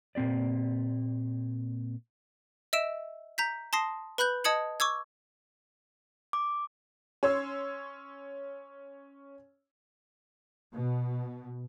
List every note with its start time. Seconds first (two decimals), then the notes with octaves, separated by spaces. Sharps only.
0.15 A#2 A#3 C4 G4 D5
2.73 D#5 E5 E6 D7 E7
3.38 A#5 G6 B6
3.73 A5 C6 D#6 A#6 C7
4.18 B4 B5 F#6 G6 F#7
4.44 D#5 A5 D#6 G#6 C#7 F#7
4.80 C#6 D6 E6 G#6
6.33 D6
7.23 C#4 C#5 C6 E6
10.73 B2